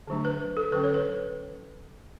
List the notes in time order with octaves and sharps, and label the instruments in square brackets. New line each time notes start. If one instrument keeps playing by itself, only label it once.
[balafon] D3 F#3 A3 D4
B4
A4
D3 F#3 C#4 B4
C#5
B4